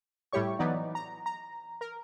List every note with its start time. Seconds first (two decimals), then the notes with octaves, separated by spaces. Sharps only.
0.33 A2 G3 E4 G4 C#5 C#6
0.59 E3 F#3 B3 D#4 D5
0.95 A#5
1.26 A#5
1.81 A#4